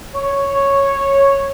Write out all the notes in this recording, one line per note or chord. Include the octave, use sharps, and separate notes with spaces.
C#5